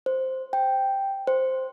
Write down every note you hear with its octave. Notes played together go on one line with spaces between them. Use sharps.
C5
G5
C5